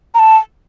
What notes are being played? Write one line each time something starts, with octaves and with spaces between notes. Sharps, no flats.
A#5
A5